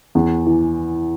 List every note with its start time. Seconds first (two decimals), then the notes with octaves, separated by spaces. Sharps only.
0.15 E2
0.46 E3